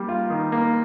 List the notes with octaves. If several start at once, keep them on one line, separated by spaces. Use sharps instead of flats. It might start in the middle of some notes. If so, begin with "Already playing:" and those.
Already playing: G3 A#3
F4
D#3
A#3